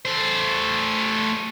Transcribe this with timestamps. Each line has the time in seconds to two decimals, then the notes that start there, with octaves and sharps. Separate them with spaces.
0.05 A3 C5